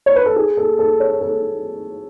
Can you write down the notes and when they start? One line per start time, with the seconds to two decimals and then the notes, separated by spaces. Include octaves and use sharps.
0.06 C#5
0.16 B4
0.26 A4
0.36 G#4
0.57 A4
0.79 A4
1.00 C#5
1.21 A4